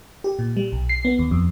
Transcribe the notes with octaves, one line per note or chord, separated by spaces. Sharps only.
G4
A#2
G3
B1
C7
B3
D#2
F2